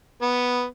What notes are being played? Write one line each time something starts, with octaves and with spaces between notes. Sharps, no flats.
B3